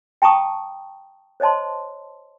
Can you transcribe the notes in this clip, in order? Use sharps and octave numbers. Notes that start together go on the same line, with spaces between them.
G5 A5 A#5 C#6 D#6
C5 C#5 D#5 A5 C6